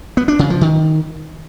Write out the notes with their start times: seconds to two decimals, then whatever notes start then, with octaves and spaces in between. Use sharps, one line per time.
0.17 B3
0.28 D4
0.39 C#3
0.50 F3
0.61 D#3